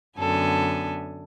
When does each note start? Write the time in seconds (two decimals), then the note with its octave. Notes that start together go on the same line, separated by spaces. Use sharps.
0.18 F#2 D3 B3 D4 A4 G#5